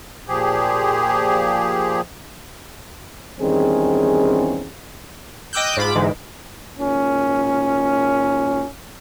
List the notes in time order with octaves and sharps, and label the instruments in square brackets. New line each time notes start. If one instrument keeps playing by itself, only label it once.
[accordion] A#2 F3 G4 G#4
[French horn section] E2 D#3 G3 C4 C#4 G#4
[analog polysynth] D#5 G5 D6 E6 F#6 G6
G#2 F4 B5 D6
G#2 D3 E3 G#3
[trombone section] G#1 A#2 C#4